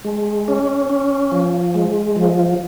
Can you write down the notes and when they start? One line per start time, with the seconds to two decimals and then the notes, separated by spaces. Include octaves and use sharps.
0.05 G#3
0.48 C#4
0.89 C#4
1.32 F3
1.74 G#3
2.16 F3